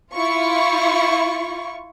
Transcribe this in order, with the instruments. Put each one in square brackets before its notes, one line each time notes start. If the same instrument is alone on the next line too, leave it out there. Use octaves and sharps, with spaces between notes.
[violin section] E4 F4 C#6